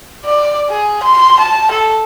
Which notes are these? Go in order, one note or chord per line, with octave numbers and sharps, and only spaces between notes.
D5
G#4
C6
A5
A4